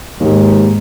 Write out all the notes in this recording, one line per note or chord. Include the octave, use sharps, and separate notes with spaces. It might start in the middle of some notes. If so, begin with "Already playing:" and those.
D#2 G#2